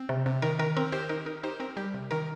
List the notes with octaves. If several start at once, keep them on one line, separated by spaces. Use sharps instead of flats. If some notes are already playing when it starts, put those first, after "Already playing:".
Already playing: C4
C3
C3
D#3 A#4
D#3 A#4
C4 A#4
D#3 G4 C5
D#4 A#4
D#4 A#4
D#4 G4 C5
C4 A#4
G3 G4
C3
D#3 A#4